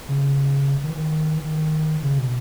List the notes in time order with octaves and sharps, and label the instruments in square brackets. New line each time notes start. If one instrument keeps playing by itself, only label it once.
[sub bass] C#3
D#3
E3
D#3
E3
D#3
C#3
B2